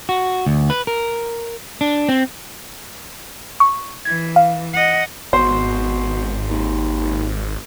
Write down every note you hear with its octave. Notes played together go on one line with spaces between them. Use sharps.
F#4
D2
B4
A#4
D4
C4
C#6
E3 G#6
F5
D#5 F#5
G#1 B2 C5
D#2